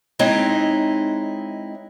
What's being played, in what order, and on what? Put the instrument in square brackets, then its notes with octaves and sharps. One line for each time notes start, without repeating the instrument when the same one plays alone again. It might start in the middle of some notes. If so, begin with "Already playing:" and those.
[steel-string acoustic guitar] G#3 C4 D#4 E4 C#5 D#5